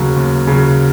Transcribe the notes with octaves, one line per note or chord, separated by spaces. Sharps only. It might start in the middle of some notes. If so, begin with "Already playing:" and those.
Already playing: D#2 C#3 F#3
D#2
C#3 F#3